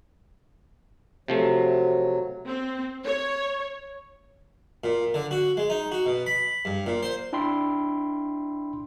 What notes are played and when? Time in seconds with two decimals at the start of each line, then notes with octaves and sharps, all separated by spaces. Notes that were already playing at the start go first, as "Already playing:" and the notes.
1.28 C3 F3 F#3 A3
2.46 C4
3.04 C#5
4.84 A#2
5.14 D3
5.31 F#4
5.57 G#3
5.70 D#4
5.92 F#4
6.06 B2
6.27 B5
6.65 G2
6.86 A#2
7.03 C5
7.33 D4 E4 G5 B5 C6